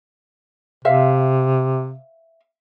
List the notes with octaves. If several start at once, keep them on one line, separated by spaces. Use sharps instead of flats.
C3 C5 E5 F5